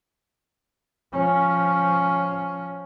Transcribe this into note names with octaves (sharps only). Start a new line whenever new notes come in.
F3 C#4